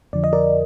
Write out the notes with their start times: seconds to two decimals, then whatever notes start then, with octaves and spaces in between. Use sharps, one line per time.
0.13 F2 D3 F3 D5
0.24 D#5
0.33 A#4 D5